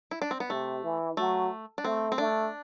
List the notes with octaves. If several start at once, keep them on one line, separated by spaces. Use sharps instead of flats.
E4
D4
C4
B3
C3 A3
E3
F#3 A3
D4
A3 C4
C4
A3 D4